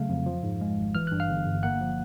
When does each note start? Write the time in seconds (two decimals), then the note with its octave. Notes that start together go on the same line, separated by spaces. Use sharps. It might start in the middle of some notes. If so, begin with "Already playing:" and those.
Already playing: C#3 F#3 A3 F5
0.09 F2
0.26 F3
0.43 G#2
0.61 G#3
0.78 G#1
0.95 E3 F6
1.07 G2 F#6
1.20 F5 F6
1.29 G1
1.46 G1
1.63 A#3 F#5 F#6
1.81 F3